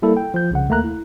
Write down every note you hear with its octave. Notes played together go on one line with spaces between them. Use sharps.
G3 A#3 E4 A4
G5
F3 G6
C2 C#3 F#5
D#2 A3 A#3 A#5 F#6
E4